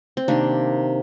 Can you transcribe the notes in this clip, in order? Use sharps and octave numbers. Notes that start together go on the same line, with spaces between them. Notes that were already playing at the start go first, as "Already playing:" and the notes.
C4
C3 D#3 A#3 D4